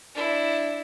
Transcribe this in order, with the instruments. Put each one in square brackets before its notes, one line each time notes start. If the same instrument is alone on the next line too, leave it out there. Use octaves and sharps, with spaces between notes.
[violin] D4 E4